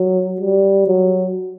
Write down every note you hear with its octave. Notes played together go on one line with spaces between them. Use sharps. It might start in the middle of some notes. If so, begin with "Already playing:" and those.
Already playing: F#3
G3
F#3